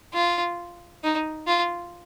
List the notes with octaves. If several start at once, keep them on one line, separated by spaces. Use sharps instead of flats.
F4
D#4
F4